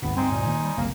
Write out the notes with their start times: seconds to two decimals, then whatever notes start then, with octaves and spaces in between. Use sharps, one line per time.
0.02 G#1 D#2 B2 B3
0.16 D2 G2 G3 C4 D#4 C5 G#5
0.31 A#2
0.46 D#3 F#3 A#3
0.63 G3
0.77 F#1 C2 A#3